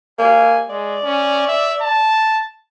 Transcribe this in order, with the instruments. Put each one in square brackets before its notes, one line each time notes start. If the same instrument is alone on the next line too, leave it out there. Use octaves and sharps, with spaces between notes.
[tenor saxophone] A#3 [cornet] G#5
[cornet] G#3 [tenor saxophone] D5
[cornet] C#4
E5
A5